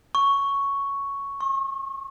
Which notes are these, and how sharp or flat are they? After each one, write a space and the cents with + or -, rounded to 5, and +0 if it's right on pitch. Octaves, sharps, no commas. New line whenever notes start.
C#6 +5
C#6 -40